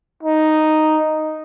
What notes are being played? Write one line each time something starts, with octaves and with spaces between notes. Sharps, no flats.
D#4